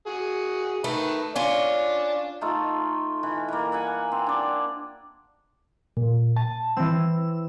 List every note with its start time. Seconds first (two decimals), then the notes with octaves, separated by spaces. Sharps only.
0.07 F#4 G#4
0.84 D#3 A3 B4
1.36 C#4 D4 F4 D5
2.41 A3 D#4 F4 A4
3.23 E3
3.48 E3 A#3
3.72 E5 F#5 G#5
4.12 C4
4.26 D4 D5
5.97 A#2
6.37 A5 D#7
6.77 E3 C4 E6